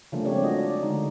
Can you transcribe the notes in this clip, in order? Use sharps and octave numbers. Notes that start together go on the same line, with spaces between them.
C#3 F3 G3 A3 A#3 D4
G#3 C4 G4 C#5 D5
A3 D4 F4 F#4 D#5
D5
D3 G#3 D#4